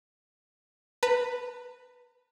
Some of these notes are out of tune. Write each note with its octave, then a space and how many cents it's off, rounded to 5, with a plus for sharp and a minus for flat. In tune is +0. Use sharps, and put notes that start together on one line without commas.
B4 +0 A#5 -45